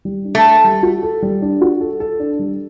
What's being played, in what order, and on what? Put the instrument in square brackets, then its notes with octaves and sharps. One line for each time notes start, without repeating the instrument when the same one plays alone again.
[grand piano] G3
D4
[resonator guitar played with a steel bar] A3
[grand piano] A4
G3
F#4
A4
G3
D4
F#4
A4
A4
D4
G3